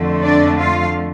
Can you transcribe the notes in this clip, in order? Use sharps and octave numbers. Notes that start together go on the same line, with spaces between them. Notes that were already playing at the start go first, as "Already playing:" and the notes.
Already playing: F2 D3 A3
D4 D5
F4 F5